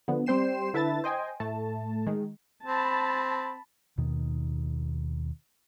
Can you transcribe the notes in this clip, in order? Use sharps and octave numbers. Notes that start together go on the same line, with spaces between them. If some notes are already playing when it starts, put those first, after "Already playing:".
D3 F3 B3
G3 C4 C5 G5 C7 E7
D3 E4 B4 E5 A5 A6
C5 D#5 G5 G#5
A2 A3 A5
D#3 G#3
C4 A5 B5
D#2 B2 D#3